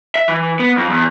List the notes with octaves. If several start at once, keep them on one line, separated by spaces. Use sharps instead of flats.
E5
E3
B3
F2
E2